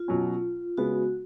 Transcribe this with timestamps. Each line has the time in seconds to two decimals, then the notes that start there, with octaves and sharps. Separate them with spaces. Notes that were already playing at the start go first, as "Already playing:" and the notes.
Already playing: F4
0.08 B2 F#3 C#4
0.78 C#3 G#3 B3 F#4